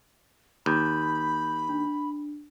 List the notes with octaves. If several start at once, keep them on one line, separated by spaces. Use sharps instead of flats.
D#2 B5 G6
D4